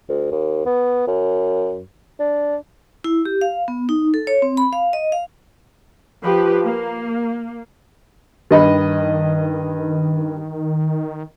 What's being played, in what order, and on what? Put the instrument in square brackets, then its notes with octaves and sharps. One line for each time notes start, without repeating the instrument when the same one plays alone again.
[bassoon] D2
D#2
B3
F#2
D4
[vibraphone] E4
G4
F5
B3
D#4
A4
C#5
C4
B5
F5
D#5
F5
[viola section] F3 G4 B4
A#3
[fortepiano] G2 D#5 B5 [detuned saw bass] D#3